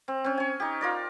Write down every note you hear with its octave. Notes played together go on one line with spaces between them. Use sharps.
C4
C4 C#4
C#5 G#5
D#4 G4
F4 A#4 D5